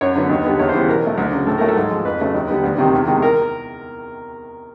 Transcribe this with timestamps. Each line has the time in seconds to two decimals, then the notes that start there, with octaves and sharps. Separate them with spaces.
0.01 F#2 C#5
0.16 D3 F#3 B3
0.30 D#2
0.45 D3 G3 B3
0.59 E2 C#5
0.69 C5
0.74 C#3 E3 G3 B3
0.88 B2 A#4
1.03 F#3 A3
1.18 D2
1.32 C#3 F#3
1.47 A2 A4
1.58 F#3 A3 A#4
1.68 A4
1.76 G#2
1.91 F3 G#3
2.05 F2 B4
2.20 C#3 F#3 A3
2.34 D#2
2.49 D3 G3 B3
2.64 D2
2.78 C3 D#3 G3
2.93 E2
3.08 C3 D#3 G#3
3.22 A#4